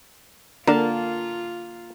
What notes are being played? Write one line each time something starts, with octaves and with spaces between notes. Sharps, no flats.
D3 A#3 D4 F4 A#4 A5